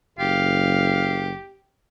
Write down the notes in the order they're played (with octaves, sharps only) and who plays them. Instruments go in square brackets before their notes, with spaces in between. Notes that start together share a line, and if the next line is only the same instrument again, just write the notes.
[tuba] F#1 [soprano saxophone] G4 [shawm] F5